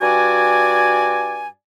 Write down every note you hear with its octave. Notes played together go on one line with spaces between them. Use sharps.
G2 F#4 D5 G#5